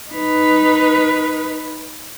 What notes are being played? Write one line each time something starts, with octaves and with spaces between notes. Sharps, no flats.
D#4 B4